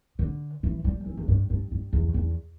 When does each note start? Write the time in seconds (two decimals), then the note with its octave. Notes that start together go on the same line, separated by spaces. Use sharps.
0.19 D3
0.63 E3
0.84 G3
1.06 E3
1.17 E2
1.28 G2
1.50 G2
1.71 G2
1.93 E2
2.14 E2